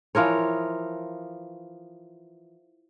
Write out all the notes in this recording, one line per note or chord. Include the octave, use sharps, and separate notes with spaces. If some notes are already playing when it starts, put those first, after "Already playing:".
E3 F3 A#4 C#5